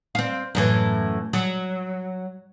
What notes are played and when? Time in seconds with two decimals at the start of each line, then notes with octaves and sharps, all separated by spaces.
0.15 C4 F5
0.55 F#2 A2 E3
1.33 F#3